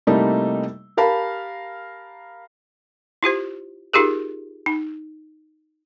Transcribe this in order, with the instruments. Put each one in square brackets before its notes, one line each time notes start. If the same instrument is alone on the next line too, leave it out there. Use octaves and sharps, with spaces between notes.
[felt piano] C3 G3 A3 A#3 D#4 E4
G4 A#4 F5 A5 B5
[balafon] E4 F4 G4 C5
D#4 F4 G4 G#4 A#4
D#4